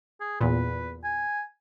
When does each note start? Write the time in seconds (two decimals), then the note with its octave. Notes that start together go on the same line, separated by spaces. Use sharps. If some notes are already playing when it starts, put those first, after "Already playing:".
0.21 G#4
0.41 E2 A#2 B4
1.04 G#5